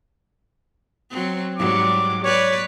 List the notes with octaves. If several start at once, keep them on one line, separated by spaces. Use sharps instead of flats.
F#3 C4
G#2 F#3 G3 D6
B4 C#5 D5